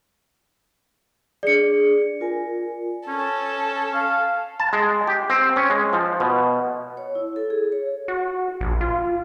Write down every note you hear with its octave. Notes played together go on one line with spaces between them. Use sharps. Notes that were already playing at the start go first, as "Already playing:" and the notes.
D4 G#4 D5 C#7
F4 A#4 G#5
C#4 A4
F5
A5
G#3
G4
C4
C#4
G#3
F3
B2
C#5
E4
A4
G#4
C#5
F#4
A#1
F4